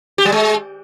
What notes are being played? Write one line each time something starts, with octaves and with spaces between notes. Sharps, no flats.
G4
G3
G#3